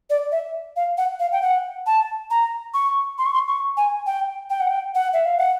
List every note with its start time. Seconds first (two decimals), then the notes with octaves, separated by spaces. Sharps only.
0.10 D5
0.32 E5
0.76 F5
0.98 F#5
1.20 F5
1.32 G5
1.42 F#5
1.86 A5
2.30 A#5
2.74 C#6
3.18 C6
3.26 C#6
3.34 C6
3.48 C#6
3.77 G#5
4.06 G5
4.50 G5
4.60 F#5
4.70 G5
4.95 F#5
5.13 E5
5.26 F5
5.38 F#5